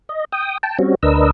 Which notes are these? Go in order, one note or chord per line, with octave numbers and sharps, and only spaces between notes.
D#5
G5 D#6
G5 A5
G3 C4 C#4 F#4
D2 D4 A#4 B4 D#5 E6